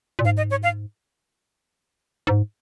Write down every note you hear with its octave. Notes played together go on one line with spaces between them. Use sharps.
A#2
G#2 F5
D#5
C#5
F5
G#2